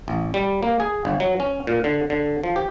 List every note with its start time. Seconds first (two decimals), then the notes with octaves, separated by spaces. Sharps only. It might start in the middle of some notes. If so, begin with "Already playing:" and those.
0.08 A1
0.34 G3
0.63 A#3
0.80 G#4
1.05 G1
1.20 F#3
1.40 C#4
1.67 A#2
1.84 D3
2.10 D3
2.44 F3
2.56 G4